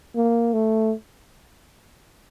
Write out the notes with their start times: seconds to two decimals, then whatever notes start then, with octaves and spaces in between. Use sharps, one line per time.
0.16 A#3
0.54 A3